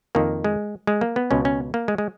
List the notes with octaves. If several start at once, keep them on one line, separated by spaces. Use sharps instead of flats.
F2 D#3 A#3
G#3
G#3
A#3
B3
C#2 B2 C#4
C#4
A#3
G#3
G#3